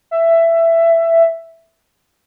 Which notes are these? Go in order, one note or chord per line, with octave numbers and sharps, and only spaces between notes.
E5